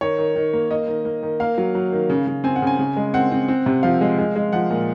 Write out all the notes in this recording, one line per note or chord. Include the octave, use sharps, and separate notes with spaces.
D#3 C#5
D#3
D#3
A#3
A#3 D#5
D#3
A#3
D#3
A#3 F5
F#3
F#3
D#3
C#3
C#3
C4 G#5
F#5
C#3 G#5
C#3
G#3
C4 F#5
C4
C4
C3
F3 F5
G#3
G#3
G#3
F3 F#5
A#2